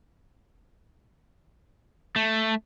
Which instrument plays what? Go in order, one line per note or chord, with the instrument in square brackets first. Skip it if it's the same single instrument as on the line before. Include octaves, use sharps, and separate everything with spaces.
[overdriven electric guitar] A3